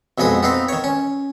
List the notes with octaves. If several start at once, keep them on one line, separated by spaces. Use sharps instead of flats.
B1 F2 G#3 B3 D#6
B3 C4 D#4 F5
D#3 C#5
C#4